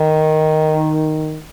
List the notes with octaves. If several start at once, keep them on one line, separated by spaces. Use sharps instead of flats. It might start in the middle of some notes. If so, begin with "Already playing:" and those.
Already playing: D#3